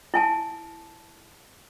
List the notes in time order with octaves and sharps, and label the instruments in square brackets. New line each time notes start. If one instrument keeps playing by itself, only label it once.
[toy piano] E4 G#5 A5